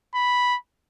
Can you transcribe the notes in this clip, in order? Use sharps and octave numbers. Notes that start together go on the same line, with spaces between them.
B5